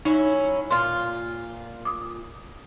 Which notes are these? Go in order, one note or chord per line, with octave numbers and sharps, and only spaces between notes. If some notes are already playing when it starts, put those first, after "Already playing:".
F#3 C#4 D#4 E4
A#2 F4 C6
D6 D#6